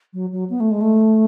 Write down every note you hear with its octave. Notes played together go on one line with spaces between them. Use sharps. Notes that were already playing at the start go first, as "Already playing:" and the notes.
F#3
F#3
B3
A3
G#3
A3